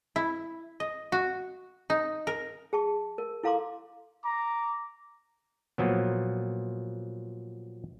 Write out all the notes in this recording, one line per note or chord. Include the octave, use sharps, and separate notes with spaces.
E4
D#5
F#4
D#4
A#4
G#4 A5 C#6
A#4
E4 A4 F5 A#5 C6 D6
A#5 D6
A#2 F3 F#3 B3